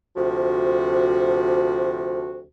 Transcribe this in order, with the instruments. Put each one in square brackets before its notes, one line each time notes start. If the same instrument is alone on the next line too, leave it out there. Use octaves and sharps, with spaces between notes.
[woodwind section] D2 C3 F3 F#4